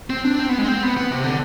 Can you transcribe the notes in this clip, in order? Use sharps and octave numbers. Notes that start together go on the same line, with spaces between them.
C4
D4
C4
B3
G#3
C4
B3
B3
C3
D3